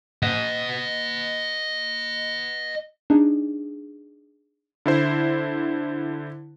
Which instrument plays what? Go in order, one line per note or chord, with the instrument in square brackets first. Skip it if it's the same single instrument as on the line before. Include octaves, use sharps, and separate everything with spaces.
[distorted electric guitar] D#5 F#5
[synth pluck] D4 D#4 G#4
[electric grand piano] D3 E4 C5